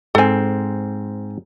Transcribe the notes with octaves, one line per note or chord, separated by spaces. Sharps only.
G#2 C4 A4 G#5